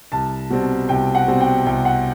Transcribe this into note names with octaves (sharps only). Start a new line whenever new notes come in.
C2 A5
B2 G3 C4
C2 G5
F#5
B2 G3 C4
G5
C2 G5
F#5